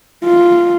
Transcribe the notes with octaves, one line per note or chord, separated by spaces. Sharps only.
F4